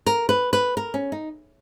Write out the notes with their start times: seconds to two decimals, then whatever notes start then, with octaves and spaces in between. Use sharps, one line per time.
0.06 A#4
0.29 B4
0.53 B4
0.77 A#4
0.94 C#4
1.12 D#4